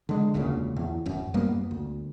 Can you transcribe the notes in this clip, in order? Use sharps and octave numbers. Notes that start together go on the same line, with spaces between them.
D3 G#3
E1 D2 A#2 C#3
E2
D1 F#2
F#2 G3 A#3 B3
D2